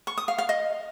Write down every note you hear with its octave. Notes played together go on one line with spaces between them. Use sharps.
C#6
D#6
F5
F5
D#5